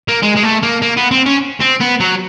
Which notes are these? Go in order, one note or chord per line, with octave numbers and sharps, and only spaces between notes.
A#3
G#3
G#3
A3
A#3
A#3
B3
C4
C#4
C4
B3
F#3